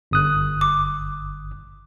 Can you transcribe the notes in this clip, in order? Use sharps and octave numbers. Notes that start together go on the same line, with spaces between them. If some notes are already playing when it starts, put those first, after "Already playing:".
G1 D#6 F#6
D6